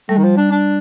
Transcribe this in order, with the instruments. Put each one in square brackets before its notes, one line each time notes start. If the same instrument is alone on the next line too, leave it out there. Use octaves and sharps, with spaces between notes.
[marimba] G3 [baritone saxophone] A3
[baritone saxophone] D#3
F3
D4
D4